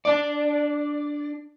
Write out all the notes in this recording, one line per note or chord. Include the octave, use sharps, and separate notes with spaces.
D4 D5